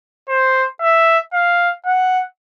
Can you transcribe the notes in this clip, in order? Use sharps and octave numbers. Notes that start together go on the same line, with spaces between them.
C5
E5
F5
F#5